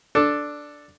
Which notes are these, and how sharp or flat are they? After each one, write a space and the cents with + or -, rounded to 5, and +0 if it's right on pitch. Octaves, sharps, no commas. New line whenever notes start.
D4 +0 A4 +0